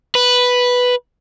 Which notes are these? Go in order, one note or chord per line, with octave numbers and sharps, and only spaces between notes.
B4